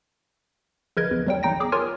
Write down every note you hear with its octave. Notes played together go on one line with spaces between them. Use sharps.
A#1 C#3 A#4 B4 D#5 G#6
E2
B1 E2 F#3 G3 G5
A1 E2 D#4 G5 A#6
G#4 D6 E6
F4 A#4 C#5 G#5